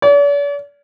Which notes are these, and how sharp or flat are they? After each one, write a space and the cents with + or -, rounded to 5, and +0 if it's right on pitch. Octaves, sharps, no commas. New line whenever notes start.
D5 -45